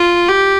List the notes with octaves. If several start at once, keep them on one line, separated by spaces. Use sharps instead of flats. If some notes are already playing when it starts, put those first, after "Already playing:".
Already playing: F4
G4